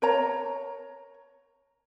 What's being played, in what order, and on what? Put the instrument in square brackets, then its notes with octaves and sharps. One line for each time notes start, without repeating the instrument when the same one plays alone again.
[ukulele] A#4 C#5 A#5